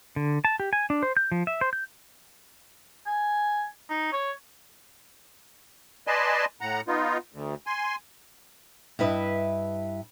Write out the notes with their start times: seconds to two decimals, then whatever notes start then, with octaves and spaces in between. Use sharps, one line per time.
0.16 D3
0.45 A5
0.60 G4
0.73 G#5
0.90 D4
1.03 C5
1.17 G6
1.32 F3
1.47 E5
1.61 C5
1.73 G6
3.07 G#5
3.90 D#4
4.13 C#5
6.07 B4 D5 D#5 G#5 A5 C6
6.61 A2 F#5 A#5
6.87 B3 D#4 F4
7.32 D2
7.67 G#5 C6
8.99 G2 E4 B4 D#5 E5